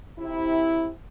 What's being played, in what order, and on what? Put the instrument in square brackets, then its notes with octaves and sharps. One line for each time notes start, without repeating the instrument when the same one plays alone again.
[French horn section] C3 E4